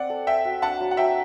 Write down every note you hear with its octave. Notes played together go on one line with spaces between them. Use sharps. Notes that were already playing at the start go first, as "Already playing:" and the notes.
Already playing: C4 D5 F#5
A4
A4 E5 G5
F#4
D4 F#5 A5
F#3
F#5
F#3 E5 G5